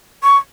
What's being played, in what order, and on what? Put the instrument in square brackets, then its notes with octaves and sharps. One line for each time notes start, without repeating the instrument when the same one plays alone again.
[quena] C#6